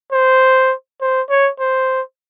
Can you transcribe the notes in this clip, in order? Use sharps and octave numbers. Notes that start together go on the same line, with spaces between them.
C5
C5
C#5
C5